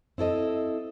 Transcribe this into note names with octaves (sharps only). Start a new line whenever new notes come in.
C4 E4 A4 D#5